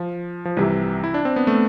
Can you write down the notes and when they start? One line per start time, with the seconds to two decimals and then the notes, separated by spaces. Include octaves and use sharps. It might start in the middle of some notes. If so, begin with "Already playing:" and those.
Already playing: F3
0.45 F3
0.57 C2 C3 E3 G3
1.04 E4
1.14 D4
1.25 C4
1.36 B3
1.47 A3